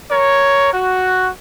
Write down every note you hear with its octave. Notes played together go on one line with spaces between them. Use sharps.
A#4 C#5
F#4